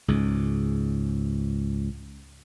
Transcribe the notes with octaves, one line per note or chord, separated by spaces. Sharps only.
C#2 G#2